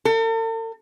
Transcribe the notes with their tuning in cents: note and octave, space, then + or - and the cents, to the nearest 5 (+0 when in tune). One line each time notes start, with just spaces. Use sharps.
A4 +45